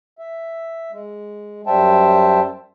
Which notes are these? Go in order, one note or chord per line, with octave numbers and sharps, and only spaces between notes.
E5
G#3
F#2 G3 C5 E5 G5 A5